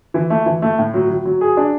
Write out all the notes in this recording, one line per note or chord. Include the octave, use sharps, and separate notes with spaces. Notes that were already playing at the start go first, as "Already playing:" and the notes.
E3
A3
E3
A3
A2
F#3
F#3
F#3
G#4
D4